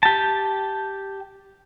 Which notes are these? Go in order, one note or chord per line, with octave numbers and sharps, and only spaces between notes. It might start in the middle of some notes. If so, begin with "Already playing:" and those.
G4 A5